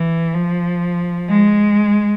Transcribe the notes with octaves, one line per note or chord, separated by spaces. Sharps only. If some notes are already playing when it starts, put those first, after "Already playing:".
Already playing: E3
F3
G#3